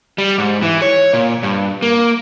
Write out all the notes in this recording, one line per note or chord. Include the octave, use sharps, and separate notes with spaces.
G3
G#2
E3
C#5
A#2
G2
A#3